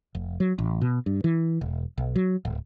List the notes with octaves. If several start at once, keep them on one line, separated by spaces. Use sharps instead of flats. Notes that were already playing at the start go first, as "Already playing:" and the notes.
F1
F#3
A1
B2
G2
E3
E1
B1
F#3
D1